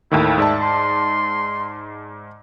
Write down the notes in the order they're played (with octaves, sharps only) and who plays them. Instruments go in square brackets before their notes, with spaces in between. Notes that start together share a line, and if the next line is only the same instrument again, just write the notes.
[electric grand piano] D#2 A2 D#3 [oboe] E4
[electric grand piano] G#2 D5 A5 [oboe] E5
[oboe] C6